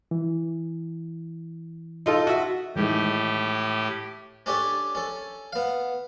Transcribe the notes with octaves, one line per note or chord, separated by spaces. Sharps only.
E3
D#4 F4 A4
F#4 E5
A2 D#3 E3 G#3 G4
C#4 D4 G4 A4 C#5
C#4 A4
B3 F5